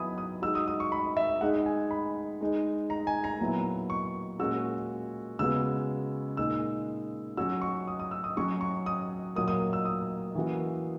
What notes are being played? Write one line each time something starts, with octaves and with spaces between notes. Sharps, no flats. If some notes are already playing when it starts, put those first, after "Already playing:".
Already playing: F#3 B3 E4 G#5 B5 D#6
D#6
G#3 D#4 F#4 E6
D#6
D#6
C#6
B5
E5
G#3 D#4 G#4 F#5
G#5
B5
G#3 D#4 G#4
A#5
G#5
A#5
A#2 F#3 B3 E4
C#6
A#2 G#3 C#4 F#4 E6
C#3 G#3 B3 F#4 E6
A#2 G#3 D#4 G#4 E6
F#3 C#4 F#4 E6
C#6
D#6
D#6
E6
D#6
F#3 C#4 F#4 C#6
C#6
D#6
A#2 F#3 A#3 D#6
D#6
E6
D#6
E3 A#3 C#4 F#4